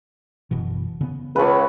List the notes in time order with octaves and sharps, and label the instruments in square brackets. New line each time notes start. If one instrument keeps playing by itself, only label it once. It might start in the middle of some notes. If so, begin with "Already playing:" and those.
[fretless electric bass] F#1 B2 E3
C#3 B3
[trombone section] C#2 [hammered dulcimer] B4 C#5